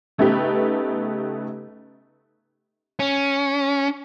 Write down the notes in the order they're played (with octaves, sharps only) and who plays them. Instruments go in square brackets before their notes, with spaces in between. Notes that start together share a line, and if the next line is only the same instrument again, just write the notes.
[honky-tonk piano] C#3 A3 B3 D#4 G4 B4
[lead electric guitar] C#4